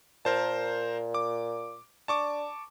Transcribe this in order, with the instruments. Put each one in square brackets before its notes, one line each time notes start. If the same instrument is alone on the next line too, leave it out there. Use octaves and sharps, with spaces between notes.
[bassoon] A#2 [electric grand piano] A#4 C5 A5
[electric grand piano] D6
[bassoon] D4 [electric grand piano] A5 C#6 D6